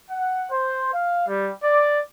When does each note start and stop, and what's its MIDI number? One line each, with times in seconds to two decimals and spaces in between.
0.10 0.47 78
0.51 0.90 72
0.93 1.26 77
1.27 1.50 55
1.63 2.00 74